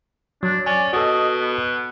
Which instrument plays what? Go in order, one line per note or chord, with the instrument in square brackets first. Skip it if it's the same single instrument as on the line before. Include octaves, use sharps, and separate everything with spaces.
[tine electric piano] F#3 [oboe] D4
[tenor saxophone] C#4 [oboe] D5 [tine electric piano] G#5
[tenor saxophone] B2 [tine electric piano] F#4 A4 [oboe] D#5
[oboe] B3